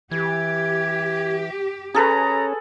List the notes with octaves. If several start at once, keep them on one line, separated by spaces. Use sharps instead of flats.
E3 G4 G#6
C#4 G#4 A4 B4 A#5